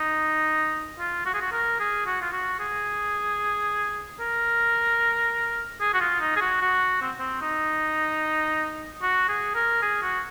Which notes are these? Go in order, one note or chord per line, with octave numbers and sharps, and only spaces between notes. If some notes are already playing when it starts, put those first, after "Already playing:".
Already playing: D#4
F4
F#4
G#4
F#4
A#4
G#4
F#4
F4
F#4
G#4
A#4
G#4
F#4
F4
D#4
G#4
F#4
F#4
C4
C4
D#4
F#4
G#4
A#4
G#4
F#4